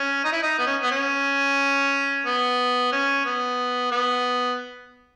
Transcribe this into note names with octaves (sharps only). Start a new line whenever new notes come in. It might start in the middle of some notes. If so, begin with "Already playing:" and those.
Already playing: C#4
D#4
E4
D#4
B3
C#4
B3
C#4
B3
C#4
B3
B3